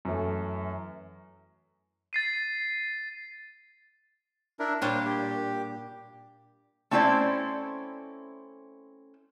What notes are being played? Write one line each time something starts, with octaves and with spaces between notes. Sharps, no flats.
F#2 E3 A3
A6 C7 D#7
D4 E4 A#4
A#2 G3 D4 C5 C#5
G4
A3 C4 C#4 E4 C5 D5